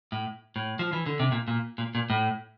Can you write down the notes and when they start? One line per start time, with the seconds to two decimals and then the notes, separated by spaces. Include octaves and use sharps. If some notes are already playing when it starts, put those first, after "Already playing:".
0.12 A2
0.56 A2
0.79 F3
0.93 E3
1.06 D3
1.20 C3
1.32 A#2
1.48 A#2
1.78 A#2
1.95 A#2
2.10 A2